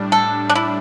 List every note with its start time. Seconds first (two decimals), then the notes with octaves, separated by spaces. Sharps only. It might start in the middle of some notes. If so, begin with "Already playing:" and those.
Already playing: A2 G3 D4
0.12 A4
0.50 D4
0.55 E4